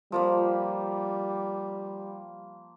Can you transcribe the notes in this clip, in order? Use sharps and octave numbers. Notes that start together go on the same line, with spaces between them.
F3 G3 A#3 B5